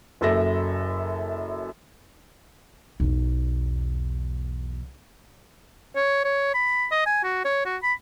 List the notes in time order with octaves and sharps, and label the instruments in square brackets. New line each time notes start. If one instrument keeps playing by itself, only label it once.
[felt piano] F#1 F#2 A4 E5 A#6
[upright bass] B1 E2
[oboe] C#5
C#5
B5
D#5
G#5
F#4
C#5
F#4
B5